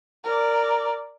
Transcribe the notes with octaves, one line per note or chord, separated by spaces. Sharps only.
A#4 D5